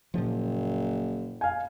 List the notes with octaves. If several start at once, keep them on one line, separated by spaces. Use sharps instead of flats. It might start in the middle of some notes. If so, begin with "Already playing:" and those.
F#1 A#2 F3
F5 G#5